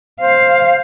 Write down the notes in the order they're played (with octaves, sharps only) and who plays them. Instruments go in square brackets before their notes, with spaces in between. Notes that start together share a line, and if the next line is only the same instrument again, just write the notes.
[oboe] C5 [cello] F5